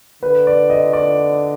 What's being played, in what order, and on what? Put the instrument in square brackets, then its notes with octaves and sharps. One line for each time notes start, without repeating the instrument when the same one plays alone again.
[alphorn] D3 [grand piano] B4
[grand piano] D5
D#5
D5